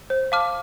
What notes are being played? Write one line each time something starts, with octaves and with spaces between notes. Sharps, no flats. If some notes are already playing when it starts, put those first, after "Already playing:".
C5
F5 A5 D6 F6